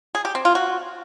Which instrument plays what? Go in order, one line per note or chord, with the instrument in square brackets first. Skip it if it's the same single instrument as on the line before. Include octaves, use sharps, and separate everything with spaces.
[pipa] G#4
G4
C4
F4
F#4